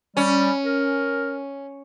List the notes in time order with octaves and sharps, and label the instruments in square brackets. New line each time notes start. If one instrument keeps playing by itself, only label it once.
[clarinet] G3 [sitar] C#4
[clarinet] A#4